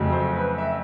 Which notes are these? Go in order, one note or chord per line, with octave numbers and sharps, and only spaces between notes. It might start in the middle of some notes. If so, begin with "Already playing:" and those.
Already playing: F2 C#3 F#3 A3
C5
B4
E5